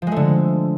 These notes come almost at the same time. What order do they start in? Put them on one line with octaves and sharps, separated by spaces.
F3 G#3 A3 D3